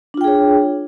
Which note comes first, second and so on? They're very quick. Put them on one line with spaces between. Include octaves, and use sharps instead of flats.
D4 F4 G5 G#4 C#5